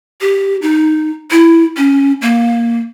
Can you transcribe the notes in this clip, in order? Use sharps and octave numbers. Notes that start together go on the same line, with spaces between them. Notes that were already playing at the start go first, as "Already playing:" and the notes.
G4
D#4
E4
C#4
A#3